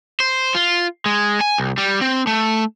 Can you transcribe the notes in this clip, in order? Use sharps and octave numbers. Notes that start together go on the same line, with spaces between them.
C5
F4
G#3
G#5
C2
G3
C4
A3